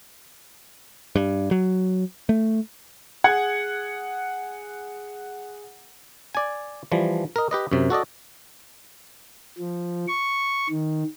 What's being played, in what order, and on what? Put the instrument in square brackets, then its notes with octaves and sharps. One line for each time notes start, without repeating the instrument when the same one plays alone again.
[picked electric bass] G2
F#3
A3
[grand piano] G#4 F#5 G#6
[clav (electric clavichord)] D5 G#5
E3 F3 G3
A#4 D#5
G4 B4 D#5
F#2 C3
F#4 A4 D5 D#5
[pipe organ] F3
C#6
D#3